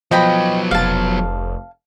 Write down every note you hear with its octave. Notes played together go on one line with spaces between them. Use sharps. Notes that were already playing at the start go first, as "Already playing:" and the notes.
F3 F#3 B3 D#5 G5 B5
F1 F5 A5